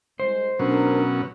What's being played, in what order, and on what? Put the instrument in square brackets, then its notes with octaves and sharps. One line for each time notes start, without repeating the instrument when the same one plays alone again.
[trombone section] C2 G#3 [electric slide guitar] C5
[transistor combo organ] B2 F#3 C#4 [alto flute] D4 [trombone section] A#4